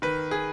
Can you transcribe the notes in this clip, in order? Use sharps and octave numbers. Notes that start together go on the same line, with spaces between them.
D#3 B4
G#4